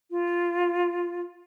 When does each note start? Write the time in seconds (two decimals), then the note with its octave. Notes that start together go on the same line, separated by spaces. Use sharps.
0.11 F4